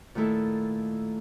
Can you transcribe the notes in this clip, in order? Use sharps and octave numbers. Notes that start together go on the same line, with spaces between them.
A#2 D#3 A3 E4 A4